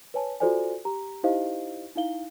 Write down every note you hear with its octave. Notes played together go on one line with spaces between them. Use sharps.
B4 C#5 G#5 A5
F4 F#4 A4 C5 D5 G#5
G4 A#5
D#4 E4 G4 C5 D#5 F5
D#4 E4 F5 G7